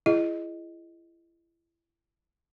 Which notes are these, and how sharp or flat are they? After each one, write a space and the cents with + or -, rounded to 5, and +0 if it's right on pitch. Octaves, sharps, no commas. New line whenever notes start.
E4 +30 G#4 +0 D#5 +0